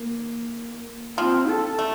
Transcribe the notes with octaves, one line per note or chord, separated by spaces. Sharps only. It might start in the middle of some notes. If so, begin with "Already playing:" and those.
Already playing: A#3
F3 C4
A4
A3